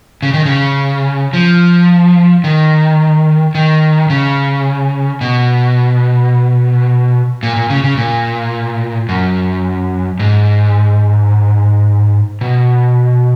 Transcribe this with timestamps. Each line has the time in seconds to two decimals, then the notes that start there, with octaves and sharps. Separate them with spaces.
0.22 C#3
0.34 D#3
0.45 C#3
1.33 F3
2.44 D#3
3.55 D#3
4.10 C#3
5.21 B2
7.43 A#2
7.56 A#2
7.70 C#3
7.84 C#3
7.97 A#2
9.09 F#2
10.20 G#2
12.41 B2